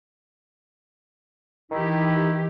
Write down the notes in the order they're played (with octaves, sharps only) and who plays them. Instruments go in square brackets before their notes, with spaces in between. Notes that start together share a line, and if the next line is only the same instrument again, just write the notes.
[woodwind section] D#3 D#4 E4 [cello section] E3 G4